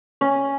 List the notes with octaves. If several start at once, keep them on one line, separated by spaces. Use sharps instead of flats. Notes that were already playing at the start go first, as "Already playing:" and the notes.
C#4